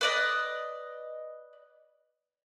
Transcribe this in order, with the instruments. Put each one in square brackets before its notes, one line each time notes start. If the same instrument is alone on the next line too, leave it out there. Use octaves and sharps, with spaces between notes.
[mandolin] B4 D5 D#5